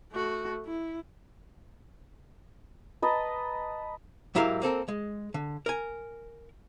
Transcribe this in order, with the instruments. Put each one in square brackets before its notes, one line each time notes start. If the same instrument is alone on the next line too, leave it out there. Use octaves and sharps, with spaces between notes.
[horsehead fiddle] A3 F#4
E4
[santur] B4 D#5 A5 A#5
[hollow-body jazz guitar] G#2 F#3 E4 G4 A#4 F5
A#3 C4 A4 A#4
G#3
D3
A#4 G#5